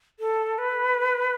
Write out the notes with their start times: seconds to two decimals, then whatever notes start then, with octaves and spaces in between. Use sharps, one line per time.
0.20 A4
0.58 B4